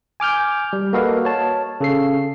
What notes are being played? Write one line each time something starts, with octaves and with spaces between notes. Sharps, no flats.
G#5 D6 F6 G6
G3
A#3 F#4 A4 B4 D#5 F5
C#5 A5
C#3 A4 C7